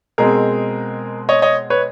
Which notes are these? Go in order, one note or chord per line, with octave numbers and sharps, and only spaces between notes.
B2 G#3 C4 G#4 A#4
C#5 D#5
C#5 D#5
B4 C#5